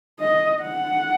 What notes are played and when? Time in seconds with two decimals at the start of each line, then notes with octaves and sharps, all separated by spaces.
0.19 D#5
0.62 F#5